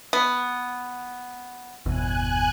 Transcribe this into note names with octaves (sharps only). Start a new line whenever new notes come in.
B3
G1 E2 B2 G#5 F#6